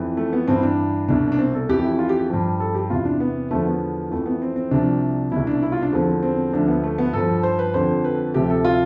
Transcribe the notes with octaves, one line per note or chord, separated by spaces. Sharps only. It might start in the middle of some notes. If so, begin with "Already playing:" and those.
Already playing: F2 E3
A3
B3
G2 E3 C4
D4
C2 B2 D4
D4
C4
A4
F2 E3 G4
E4
F4
G4
G4
G2 F3
A4
G4
E2 C3 E3 F4
D4
B3
E2 D3 F3 A3
B3
F2 E3 A3
B3
C4
C4
C2 C3 F3 D4
C2 B2 E4
D4
E4
F4
D4
E2 D3 F3 C4
C4
D2 D3 F3 D4
B3
A3
B3
B4
G2 F3 A4
C5
B4
F2 D3 F3 C5
B4
D2 C3 F3 G4
A4
F4